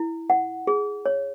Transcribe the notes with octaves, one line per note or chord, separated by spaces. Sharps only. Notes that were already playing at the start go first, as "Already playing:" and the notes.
Already playing: E4
F#5
G#4
C#5